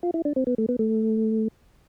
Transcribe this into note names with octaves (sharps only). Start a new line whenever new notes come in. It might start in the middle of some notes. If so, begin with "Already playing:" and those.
F4
E4
D4
C4
B3
A3
B3
A3